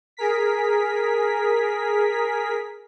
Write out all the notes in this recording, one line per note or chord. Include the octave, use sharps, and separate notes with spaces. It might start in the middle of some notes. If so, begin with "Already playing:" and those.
G#4 A#4 B6